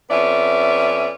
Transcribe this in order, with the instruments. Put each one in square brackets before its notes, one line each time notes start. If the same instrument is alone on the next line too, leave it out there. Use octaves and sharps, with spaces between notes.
[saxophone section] F2 B3 C#4 D5 E5